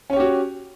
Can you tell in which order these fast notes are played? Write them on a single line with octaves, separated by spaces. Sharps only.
C#4 C#5 G4 F#4